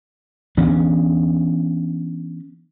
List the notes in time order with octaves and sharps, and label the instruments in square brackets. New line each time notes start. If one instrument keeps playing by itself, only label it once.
[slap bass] E3 B3 C#4 D4